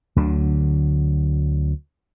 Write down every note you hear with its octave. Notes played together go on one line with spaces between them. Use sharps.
D2 D3 F#3